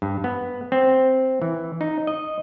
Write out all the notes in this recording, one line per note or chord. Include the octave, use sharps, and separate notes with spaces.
G2
B3
C4
E3
D#4
D#5